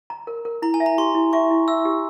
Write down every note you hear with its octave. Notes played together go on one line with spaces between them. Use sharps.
A#5
A#4
A#4
E4 A#5
G#5
E5
A#5
G4 C6
E4
E5 C#6
E4
E5 E6
G4